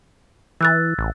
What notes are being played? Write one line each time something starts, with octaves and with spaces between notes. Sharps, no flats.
E3 E6 F#6 A6
A1